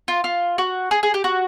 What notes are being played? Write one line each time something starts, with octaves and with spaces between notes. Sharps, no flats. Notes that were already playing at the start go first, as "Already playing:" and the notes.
F4
F4
F#4
G#4
G#4
G4
F#4